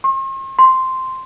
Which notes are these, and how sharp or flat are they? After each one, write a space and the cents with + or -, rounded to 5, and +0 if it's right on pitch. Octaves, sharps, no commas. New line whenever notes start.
C6 +45
C6 -5